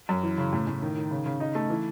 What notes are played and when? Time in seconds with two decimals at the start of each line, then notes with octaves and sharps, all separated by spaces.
0.09 F#2
0.23 E3
0.38 C#3
0.53 A2
0.67 A2
0.82 D#3
0.96 D#3
1.11 C#3
1.26 C#3
1.40 D#4
1.55 A3
1.70 E3